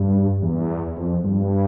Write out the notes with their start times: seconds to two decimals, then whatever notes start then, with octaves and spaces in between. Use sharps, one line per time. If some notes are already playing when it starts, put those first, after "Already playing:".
Already playing: G2
0.42 E2
0.97 F2
1.24 G2